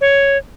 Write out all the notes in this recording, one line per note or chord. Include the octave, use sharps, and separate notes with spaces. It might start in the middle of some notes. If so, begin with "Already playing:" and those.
C#5